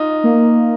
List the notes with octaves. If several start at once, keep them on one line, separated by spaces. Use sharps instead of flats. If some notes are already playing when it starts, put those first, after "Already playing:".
Already playing: D#4 F4
A#3